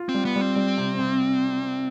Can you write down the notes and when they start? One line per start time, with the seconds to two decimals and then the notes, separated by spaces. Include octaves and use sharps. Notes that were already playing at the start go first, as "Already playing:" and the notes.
Already playing: F4
0.09 C4
0.14 G3
0.25 B3
0.36 G3
0.41 C4
0.56 G3
0.77 C3
0.99 C3